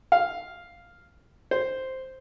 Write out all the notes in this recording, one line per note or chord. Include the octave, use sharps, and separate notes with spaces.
F5
C5